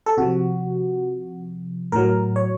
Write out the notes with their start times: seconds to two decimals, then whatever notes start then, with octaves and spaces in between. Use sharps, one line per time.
0.06 A4
0.17 C3 F3 F#4
1.92 A2 F#3 A#4
2.36 C#5